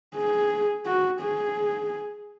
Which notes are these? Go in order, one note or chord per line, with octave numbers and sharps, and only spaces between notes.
G#4
F#4
G#4